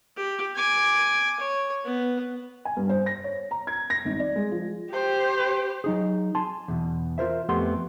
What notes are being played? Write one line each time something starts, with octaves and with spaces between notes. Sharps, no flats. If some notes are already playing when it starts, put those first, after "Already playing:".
G4
G#5 D6
C#5
B3
G#5
G2
C5
A#6
C#5
A#5
G#6
A#6
G#1
D5
G#3
F3
G4 C5
F#3 D#4 G#4
G#5 A5 C6
E2 B2
F4 A#4 C5 E5
F2 A3 B3 G4 F#5 C6